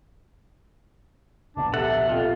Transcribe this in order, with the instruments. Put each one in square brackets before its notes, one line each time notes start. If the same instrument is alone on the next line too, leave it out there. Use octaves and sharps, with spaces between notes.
[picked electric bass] D1 A#1 B2 [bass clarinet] D4
[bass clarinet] C3 [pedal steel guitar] A4 F#5 [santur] E5
[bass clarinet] F2 [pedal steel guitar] F4